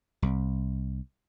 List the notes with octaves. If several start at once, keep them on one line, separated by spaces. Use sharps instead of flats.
C2